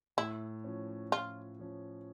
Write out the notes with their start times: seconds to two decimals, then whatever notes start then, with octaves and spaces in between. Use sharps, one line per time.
0.17 A2 E4
0.64 F3 C#4
1.12 A2 F4
1.59 F3 C#4